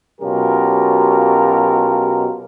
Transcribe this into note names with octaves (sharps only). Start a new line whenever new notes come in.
B2 F#3 C#4 F4 G4 A#4